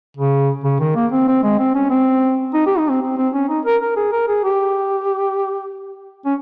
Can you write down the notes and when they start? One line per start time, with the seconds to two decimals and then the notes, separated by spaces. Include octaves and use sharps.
0.17 C#3
0.64 C#3
0.80 D#3
0.96 A#3
1.12 C4
1.28 C4
1.44 G#3
1.59 C4
1.75 C#4
1.91 C4
2.54 D#4
2.67 G4
2.78 D#4
2.90 C4
3.02 C4
3.18 C4
3.34 C#4
3.49 D#4
3.66 A#4
3.82 A#4
3.96 G#4
4.12 A#4
4.28 G#4
4.44 G4
6.25 C#4